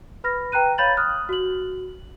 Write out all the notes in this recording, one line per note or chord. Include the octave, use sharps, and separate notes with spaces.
B4 B5 F6 A#6
B4 G5 A#5 F#6 D#7
C#5 F5 B5 G6 A6 F#7
D#6 F6 F#6
F#4 F#7